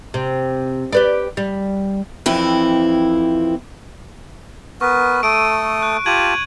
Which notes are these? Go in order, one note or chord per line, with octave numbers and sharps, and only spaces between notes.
C3
G4 B4 D5
G3
F2 E3 C4 E4
B3 A#4 B4 C#6
A3 A4 D#6 D7 D#7
F#6
F4 G4 A5 G#6 D#7 F#7